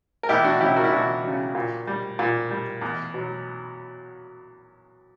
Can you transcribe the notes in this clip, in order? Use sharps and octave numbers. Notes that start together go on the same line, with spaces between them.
A#4
E2 E4 G4
D4 F#4
C#3 F#3 E4 G4
F#4 A#4
E4
E2 D4 F#4
C#3 F#3
A#2
G3
A#2
G3
E2
B2 F#3